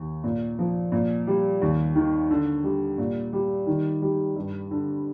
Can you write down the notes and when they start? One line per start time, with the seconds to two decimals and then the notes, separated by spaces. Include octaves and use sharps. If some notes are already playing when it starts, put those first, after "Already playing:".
Already playing: D#2
0.24 A#2
0.59 F3
0.92 A#2
1.27 G3
1.61 D#2
1.95 D#3
2.30 D3
2.64 G3
2.98 A#2
3.33 G3
3.67 D#3
4.02 G3
4.36 G2
4.71 D3